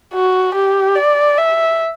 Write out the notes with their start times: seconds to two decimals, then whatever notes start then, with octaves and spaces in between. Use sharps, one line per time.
0.14 F#4
0.55 G4
0.96 D5
1.37 E5